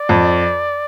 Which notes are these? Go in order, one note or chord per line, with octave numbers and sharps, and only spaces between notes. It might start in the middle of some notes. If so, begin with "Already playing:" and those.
Already playing: D5
F2